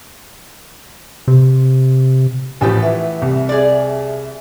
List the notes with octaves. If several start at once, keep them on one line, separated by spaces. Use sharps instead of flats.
C3
A1 F3 A3 B3 G4
E3 E5
C2
G#4 D5